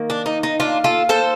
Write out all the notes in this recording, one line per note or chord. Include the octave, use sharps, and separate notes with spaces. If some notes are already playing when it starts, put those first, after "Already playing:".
Already playing: D#3 A#3
D4
D#4
D#4
D4 F4
F4 A4
A4 C5